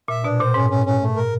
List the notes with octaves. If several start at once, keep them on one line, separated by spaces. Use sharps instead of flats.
A#2 E5
B2 D4
A#2 C5
G#2 C#4
C#4
C#4
A3
A#4